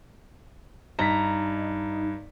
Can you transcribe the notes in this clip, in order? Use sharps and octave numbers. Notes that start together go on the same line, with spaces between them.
G2 D#4 A#5 B6